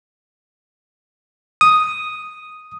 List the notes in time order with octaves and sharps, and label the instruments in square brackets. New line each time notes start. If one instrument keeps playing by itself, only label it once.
[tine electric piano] D#6